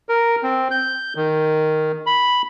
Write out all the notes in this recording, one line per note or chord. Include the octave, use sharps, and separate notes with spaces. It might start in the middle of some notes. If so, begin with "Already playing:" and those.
A#4
C4
G6
D#3
B5